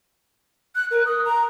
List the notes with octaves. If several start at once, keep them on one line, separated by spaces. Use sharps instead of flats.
F#6
A#4
D#6
A#5